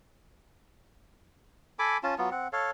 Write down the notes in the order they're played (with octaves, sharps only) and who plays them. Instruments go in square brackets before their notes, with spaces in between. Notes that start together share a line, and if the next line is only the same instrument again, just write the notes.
[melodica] A4 G#5 B5 D6
C#4 F4 A5
F#3 B3 F4
C4 F#5
A4 C#5 F5